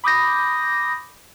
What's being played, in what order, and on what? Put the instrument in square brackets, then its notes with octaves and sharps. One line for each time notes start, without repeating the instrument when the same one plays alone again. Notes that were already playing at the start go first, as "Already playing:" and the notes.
[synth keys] B5 D6 D#6 G6 A#6